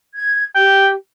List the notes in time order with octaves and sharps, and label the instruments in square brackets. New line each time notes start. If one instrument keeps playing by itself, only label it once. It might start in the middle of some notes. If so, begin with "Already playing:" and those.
[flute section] G#6
[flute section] G4 [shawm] G5